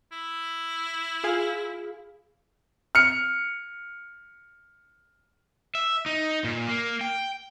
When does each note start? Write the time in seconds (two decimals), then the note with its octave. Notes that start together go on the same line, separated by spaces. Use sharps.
0.12 E4
1.24 F4 G#4 F5
2.95 F6 C#7
5.75 E5
6.06 D#4
6.44 A#2
6.68 A#3
7.01 G5